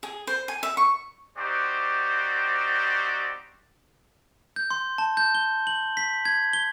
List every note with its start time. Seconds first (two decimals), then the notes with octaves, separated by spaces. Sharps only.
0.03 G#4
0.27 C5
0.48 G#5
0.63 E5
0.77 C#6
1.38 C4 D#4 F#4 G4 C5 D5
4.56 G6
4.71 C6
4.98 A5
5.17 G6
5.35 G7
5.67 F#7
5.97 B6
6.25 G#6
6.53 G7